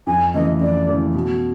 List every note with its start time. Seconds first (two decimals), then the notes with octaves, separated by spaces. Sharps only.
0.07 F2 G#5
0.34 C#3 E3 A3 D#5
0.61 F2 D5
0.87 C#3 E3 A3
1.14 B2